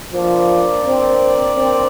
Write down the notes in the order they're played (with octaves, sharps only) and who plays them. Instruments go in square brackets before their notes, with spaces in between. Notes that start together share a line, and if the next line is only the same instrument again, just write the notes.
[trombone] F3 [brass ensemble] A#3 D4 A#4 D5
[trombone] C4
C4